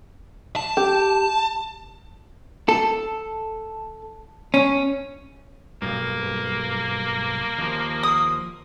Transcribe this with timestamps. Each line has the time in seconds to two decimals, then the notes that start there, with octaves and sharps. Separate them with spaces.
0.56 A5
0.77 G4
2.69 A4
4.54 C#4
5.82 B1 G2 A#3
7.59 D#2 F3
8.03 D#6